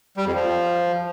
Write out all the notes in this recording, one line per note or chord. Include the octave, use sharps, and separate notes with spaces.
G3
F2
F3